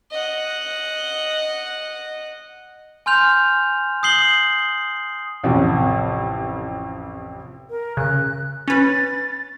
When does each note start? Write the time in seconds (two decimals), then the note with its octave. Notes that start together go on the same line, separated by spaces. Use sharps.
0.11 D#5 F#5
3.06 G#5 C6 F6 G6 F7
4.03 D#6 G6 C7 F#7 G7
5.44 A1 F2 C3
7.70 A#4
7.97 C#3 F#6
8.68 C#4 B4 A6